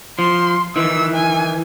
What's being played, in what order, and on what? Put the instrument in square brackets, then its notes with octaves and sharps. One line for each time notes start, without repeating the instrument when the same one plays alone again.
[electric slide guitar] F3 [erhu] C6
[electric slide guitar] D#3 E3 [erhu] E6
[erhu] G#5